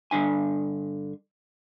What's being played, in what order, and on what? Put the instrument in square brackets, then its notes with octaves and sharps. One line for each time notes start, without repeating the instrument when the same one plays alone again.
[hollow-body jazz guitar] G2 D3 D4 G#5